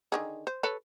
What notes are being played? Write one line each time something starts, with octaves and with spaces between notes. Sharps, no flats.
D3 D#3 G#4
C5
A4 B4 C#5